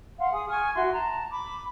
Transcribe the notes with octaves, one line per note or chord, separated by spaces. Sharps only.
F5 F#5 C6
G#4 D#6
G#5 C#6 F6
E4 F#4 C6
A5 A#5
B5 D6